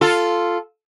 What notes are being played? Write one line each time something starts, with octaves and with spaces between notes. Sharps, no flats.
F4 A4